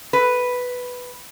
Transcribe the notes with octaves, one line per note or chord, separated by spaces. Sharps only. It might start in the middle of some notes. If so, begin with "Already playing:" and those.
B4